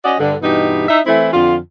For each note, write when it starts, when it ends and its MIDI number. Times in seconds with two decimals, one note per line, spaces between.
0.04 0.14 61
0.04 0.14 66
0.04 0.14 74
0.04 0.14 75
0.19 0.35 43
0.19 0.35 50
0.41 0.86 43
0.41 0.86 47
0.41 0.86 52
0.41 0.86 63
0.41 0.86 67
0.88 0.99 63
0.88 0.99 64
0.88 0.99 76
1.06 1.29 52
1.06 1.29 57
1.06 1.29 60
1.06 1.29 64
1.32 1.56 41
1.32 1.56 50
1.32 1.56 65